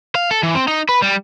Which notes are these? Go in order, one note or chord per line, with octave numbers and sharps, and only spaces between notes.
F5
A4
E3
C4
D#4
B4
G3